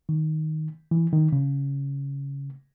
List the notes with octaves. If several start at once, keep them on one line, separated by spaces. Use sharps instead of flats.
D#3
E3
D#3
C#3